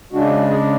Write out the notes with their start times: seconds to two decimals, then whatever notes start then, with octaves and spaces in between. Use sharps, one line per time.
0.13 C#3 G#3 D4 F#4
0.50 G#4